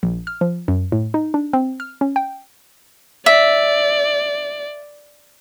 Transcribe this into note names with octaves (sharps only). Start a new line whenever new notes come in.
A#1
F6
F3
F#2
A2
D#4
D4
C4
F6
C#4
G5
D5 E5